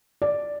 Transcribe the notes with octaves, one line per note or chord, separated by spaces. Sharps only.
D5